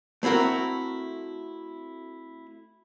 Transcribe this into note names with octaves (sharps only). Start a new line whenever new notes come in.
A3 C4 E4 F#4 A#4